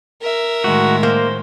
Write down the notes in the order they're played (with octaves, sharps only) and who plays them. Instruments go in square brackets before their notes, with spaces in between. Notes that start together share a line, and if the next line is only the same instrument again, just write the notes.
[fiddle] A#4 E5
[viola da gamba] A2 D#3 G#3 [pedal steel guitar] F#4
[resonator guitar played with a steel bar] A#3 [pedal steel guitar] C5